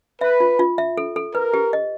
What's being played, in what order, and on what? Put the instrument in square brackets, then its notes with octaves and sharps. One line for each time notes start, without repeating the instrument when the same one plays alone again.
[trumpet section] B4 [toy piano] E5
[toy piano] F4
F4
E5
A4
A4
[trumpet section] A#4 [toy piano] B4
[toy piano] G4
D#5